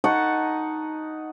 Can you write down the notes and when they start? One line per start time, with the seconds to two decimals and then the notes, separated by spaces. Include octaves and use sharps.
0.04 D#4 F#5 A5 C#6